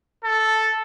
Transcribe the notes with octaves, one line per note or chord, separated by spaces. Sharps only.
A4